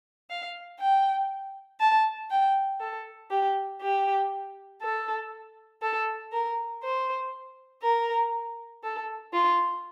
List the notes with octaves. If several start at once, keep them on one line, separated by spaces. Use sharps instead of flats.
F5
G5
A5
G5
A4
G4
G4
A4
A4
A#4
C5
A#4
A4
F4